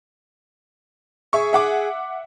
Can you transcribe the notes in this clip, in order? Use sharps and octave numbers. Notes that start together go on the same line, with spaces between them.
G#4 E5 C#6
E5 F#5 D6